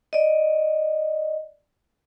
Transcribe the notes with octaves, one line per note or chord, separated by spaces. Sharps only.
D5 D#5